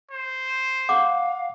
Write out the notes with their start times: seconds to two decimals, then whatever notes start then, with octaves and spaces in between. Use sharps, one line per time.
0.11 C5
0.89 F5 F#5 D6